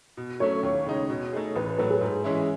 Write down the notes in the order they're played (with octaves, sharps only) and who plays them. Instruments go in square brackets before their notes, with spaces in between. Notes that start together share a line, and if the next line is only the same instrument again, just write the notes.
[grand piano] B2
[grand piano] F#3 A3 C#4 [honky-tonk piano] C#5
[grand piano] D#2
C#3 G#3 D#4
B2
A3 D#4 G#4
[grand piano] A1 [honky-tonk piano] B4
[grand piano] A2 F#3 A3 [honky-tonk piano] B4
[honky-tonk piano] G#4
[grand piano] G#2
E3 G#3 C#4 E4